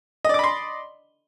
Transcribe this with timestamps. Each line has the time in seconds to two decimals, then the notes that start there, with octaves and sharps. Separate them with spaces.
0.25 D#5
0.29 D5
0.34 D6
0.39 B5
0.44 C6